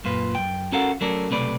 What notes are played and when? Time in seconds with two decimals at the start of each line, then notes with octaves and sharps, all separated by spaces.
0.04 F#2 A#2 F4 B4
0.35 F#2 G5
0.72 C#4 F#4 A4 A#4 F5 F#5
1.01 F#3 A3 C#4 A4 A#4 D5
1.30 B1 C3 A3 B4 D5